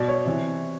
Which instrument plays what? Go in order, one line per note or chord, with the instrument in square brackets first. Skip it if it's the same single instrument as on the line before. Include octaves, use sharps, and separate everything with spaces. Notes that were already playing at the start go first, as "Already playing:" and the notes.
Already playing: [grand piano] B2 D5
C#5
C3 E3